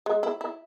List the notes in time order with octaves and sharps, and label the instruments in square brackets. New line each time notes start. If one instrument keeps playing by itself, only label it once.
[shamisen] G#3
E4
E4